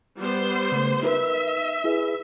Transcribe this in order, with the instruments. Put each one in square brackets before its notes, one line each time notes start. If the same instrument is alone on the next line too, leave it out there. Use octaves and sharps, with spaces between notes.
[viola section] G3 B3 C5
[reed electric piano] C#3 A3
[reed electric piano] D#4 A#4 B4 [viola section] E5
[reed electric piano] E4 G#4 B4